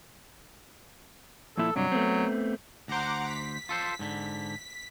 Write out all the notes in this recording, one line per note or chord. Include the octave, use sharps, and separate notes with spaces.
F2 A#2 E4 A4
G2 C3 F#3 D4
A3 B3 C4
D2 C5 F#5 A#5 D6
B6
F4 A4 C5
G#2 D3